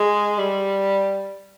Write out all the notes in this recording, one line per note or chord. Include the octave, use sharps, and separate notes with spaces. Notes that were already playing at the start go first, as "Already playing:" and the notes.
Already playing: G#3
G3